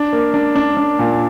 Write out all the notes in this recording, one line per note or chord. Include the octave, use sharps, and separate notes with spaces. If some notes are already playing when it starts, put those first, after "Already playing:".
Already playing: D4
A#3
D4
D4
D4
A#2